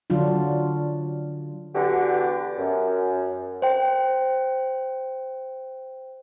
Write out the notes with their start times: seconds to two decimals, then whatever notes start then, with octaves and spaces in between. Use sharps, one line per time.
0.10 D3 F#3 D4 F4
1.75 D3 E3 B3 D4 F#4 G4
2.58 F#2
3.62 C5 G5